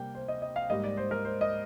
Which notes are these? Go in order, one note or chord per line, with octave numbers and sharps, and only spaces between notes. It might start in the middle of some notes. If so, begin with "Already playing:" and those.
Already playing: C3 G3 A#3 G5
C5
D#5
D#5
F5
G#2 G3 A#3 D#5
D5
C5
A#4
C5
D#5